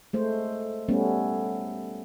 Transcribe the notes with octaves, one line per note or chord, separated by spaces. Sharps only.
G#3 A3 C5
G3 A3 B3 C#4